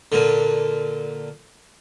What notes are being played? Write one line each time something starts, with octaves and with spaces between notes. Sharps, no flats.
A#2 D3